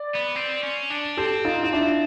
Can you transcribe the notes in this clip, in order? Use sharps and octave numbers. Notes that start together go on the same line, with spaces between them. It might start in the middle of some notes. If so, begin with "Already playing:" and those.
Already playing: D5
B3
C4
C#4
D4
C4 G4 A4
D#4 F4
F4
D4 E4